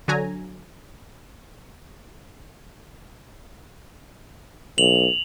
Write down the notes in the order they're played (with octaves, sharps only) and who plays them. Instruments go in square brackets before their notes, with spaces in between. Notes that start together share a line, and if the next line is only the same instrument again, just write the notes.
[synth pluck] D3 F#3 G#5 A#5
[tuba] B1 [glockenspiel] F7 F#7